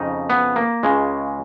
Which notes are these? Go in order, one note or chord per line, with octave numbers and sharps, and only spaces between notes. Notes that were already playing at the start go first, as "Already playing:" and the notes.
Already playing: F2 C#3 D#4
B3
A#3
C#2 C#3 G#3